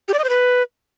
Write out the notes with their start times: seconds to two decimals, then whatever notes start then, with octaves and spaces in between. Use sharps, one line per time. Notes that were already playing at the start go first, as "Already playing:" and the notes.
0.08 G4
0.14 D5
0.19 D#5
0.24 C5
0.29 B4